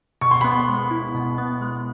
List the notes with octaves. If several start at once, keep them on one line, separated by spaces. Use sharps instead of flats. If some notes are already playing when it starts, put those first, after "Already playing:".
B2 C#6
C6
B3 B5
C6
G#3
E4
B2
B3
G#3